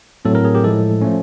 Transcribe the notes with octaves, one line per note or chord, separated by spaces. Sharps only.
A2 F#3 A3 C4 A4
A#4
G#4
G4
A2 F3 G#3 A4
F3 A3 C#4